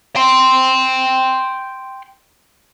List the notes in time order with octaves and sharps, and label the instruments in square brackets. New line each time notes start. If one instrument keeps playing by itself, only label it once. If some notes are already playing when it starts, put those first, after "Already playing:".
[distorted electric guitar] G5 C6